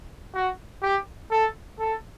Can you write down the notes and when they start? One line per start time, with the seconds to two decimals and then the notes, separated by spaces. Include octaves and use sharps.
0.34 F#4
0.82 G4
1.31 A4
1.79 A4